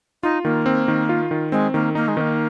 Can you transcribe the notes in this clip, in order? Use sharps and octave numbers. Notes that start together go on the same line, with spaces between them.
D#4 F4
D#3 A#3
C4
D#3
F4
D#3
G#3 C4
D#3 A#3
A#3 D#4
G#3
D#3 A#3 C4